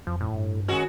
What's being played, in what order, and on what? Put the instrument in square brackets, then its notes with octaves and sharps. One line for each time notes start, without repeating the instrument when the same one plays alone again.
[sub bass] F2 [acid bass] F3
[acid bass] A2
[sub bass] G2
[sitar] D#3 G#3 F#4 [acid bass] C#4